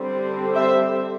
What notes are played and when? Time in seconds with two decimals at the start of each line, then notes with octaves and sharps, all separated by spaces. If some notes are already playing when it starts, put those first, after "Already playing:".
Already playing: D3 G3 C4
0.55 C5 E5